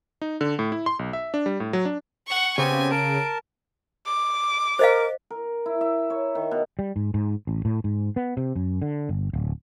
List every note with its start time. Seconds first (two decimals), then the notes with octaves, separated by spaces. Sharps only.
0.22 D#4
0.41 D3
0.59 A2
0.72 E4
0.86 C6
0.99 B1
1.13 E5
1.34 D4
1.46 G3
1.60 A2
1.73 F#3
1.85 D4
2.27 F#5 C#6
2.58 C#3 B3 C4 G4 G#5
2.91 A#4 A5 D7
4.06 D6
4.79 A#4 C5 D#5 F5
5.30 A#4
5.66 E4
5.81 E5
6.10 C#5
6.35 D#3
6.51 B2
6.79 G3
6.96 G#2
7.14 G#2
7.47 A1
7.65 A2
7.84 G#2
8.16 B3
8.37 C3
8.55 F#2
8.82 D3
9.09 G1
9.33 D1